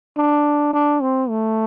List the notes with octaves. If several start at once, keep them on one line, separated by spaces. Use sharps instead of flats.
D4
D4
C4
A3